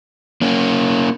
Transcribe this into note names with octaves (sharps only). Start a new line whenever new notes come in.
A#3 C#4